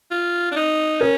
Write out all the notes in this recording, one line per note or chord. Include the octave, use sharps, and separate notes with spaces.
F4
D4
D#4
C#4 A#4